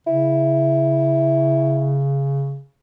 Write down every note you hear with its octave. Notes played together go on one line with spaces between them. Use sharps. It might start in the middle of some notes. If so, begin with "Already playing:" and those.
C#3 E4